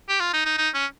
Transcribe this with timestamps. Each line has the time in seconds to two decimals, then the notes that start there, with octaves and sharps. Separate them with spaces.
0.09 G4
0.20 F4
0.34 D#4
0.46 D#4
0.58 D#4
0.74 C#4